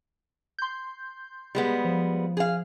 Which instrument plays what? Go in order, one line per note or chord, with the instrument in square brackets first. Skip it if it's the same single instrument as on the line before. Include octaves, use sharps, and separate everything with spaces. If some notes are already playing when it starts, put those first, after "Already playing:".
[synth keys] C6 G6
[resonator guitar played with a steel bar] G3 G#3 B3
[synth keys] F3
[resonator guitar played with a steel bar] G#4 F5